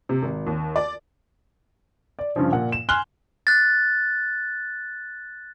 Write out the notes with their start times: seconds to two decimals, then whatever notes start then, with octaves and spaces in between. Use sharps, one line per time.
0.09 C3
0.23 G#1
0.47 D#2
0.76 D5
2.19 D5
2.36 G2 C#3 F3
2.52 A#2 F#5
2.72 E7
2.89 G#5 C6 F6 F#6 G7
3.47 F#6 A6